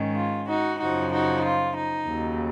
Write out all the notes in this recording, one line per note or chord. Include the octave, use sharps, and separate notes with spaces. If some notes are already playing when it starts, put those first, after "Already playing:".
Already playing: G#2 D#3 G#3 C#4
F4
D#4 F#4
F#2 C#3 F3 D#4 F#4
D#4 F#4
F4
D#4
D#2 C#3 F#3